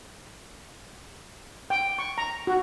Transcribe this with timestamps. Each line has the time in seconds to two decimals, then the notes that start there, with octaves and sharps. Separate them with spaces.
1.70 G5
1.99 C#6
2.18 A#5
2.47 F#4